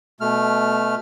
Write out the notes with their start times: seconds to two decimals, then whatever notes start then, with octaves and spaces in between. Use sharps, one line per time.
0.21 B2 A3 F6